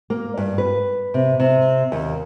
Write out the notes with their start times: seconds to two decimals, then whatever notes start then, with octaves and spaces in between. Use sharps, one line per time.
0.10 A#3
0.37 G2
0.58 B4
1.14 C3
1.40 C3
1.92 D#2